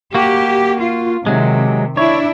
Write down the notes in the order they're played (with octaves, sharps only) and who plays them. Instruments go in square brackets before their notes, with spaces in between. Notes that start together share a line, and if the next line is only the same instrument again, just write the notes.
[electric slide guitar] A#3 F#4 [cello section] G4
[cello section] F4
[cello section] C3 D#3 [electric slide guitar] F#3 G#3
[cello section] D4 E4 [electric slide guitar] C#5